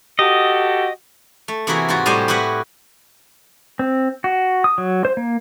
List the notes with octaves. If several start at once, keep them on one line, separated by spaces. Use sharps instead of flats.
F#4 G4 A4 D#5
A3
C3 E3 A#3 E4 F#4 G#4
G#2 F4 F#4
A2 G3 G4 C5 D#5 G#5
E4 F#4 G4 B4 F#5
C4
F#4
D#6
F#3
C5
A#3